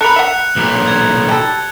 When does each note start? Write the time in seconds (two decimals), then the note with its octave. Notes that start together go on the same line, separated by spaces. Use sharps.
0.01 A4 A#4 B5 F#6 C#7 F7
0.16 E5 F#5
0.56 B1 A#2
0.88 G#6
1.29 G3 A4